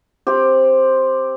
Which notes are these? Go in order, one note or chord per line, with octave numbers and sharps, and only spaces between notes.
C4 G4